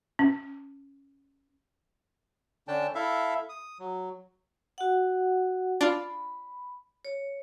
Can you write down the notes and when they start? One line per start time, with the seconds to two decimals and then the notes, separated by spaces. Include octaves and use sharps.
0.19 C#4
2.68 D3 C#4 D4 G5 A5
2.95 E4 A4 E5 F5
3.49 D#6
3.80 F#3
4.78 F#4 F#5
5.81 D4 F4 B5
7.05 C#5